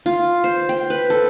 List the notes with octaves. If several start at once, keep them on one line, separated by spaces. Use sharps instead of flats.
F4
C5
G5
B4
A4